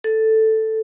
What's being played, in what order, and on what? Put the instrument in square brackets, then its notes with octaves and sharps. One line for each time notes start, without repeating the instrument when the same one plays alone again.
[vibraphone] A4